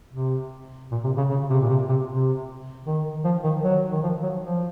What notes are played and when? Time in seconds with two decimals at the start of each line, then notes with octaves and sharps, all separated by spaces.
0.13 C3
0.92 A#2
1.04 C3
1.17 C#3
1.30 C#3
1.50 C3
1.61 A#2
1.69 C3
1.89 C3
2.08 C3
2.87 D#3
3.25 F3
3.44 D#3
3.63 F#3
3.92 D#3
4.03 F3
4.23 F#3
4.42 F3